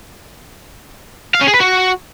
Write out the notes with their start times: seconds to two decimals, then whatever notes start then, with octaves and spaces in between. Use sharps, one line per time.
1.35 F5
1.41 C#4
1.48 G#4
1.54 B4
1.60 F#4